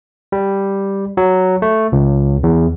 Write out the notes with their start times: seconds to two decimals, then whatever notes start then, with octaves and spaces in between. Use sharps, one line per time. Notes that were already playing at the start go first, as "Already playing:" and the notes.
0.32 G3
1.17 F#3
1.62 A3
1.92 C#2
2.43 E2